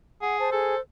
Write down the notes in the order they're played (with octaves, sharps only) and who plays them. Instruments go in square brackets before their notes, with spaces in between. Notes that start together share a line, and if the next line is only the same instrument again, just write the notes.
[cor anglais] G#4 [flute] F#5
[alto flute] C5 [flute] A5
[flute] G#4 [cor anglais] A4